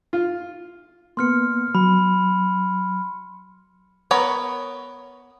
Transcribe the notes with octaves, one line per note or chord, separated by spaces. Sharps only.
F4
A#3 B3 C6 F6 C#7
F#3 B5
B3 A#4 B4 C#5 B5